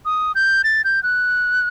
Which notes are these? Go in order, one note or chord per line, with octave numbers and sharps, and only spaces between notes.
D#6
G6
A6
G6
F#6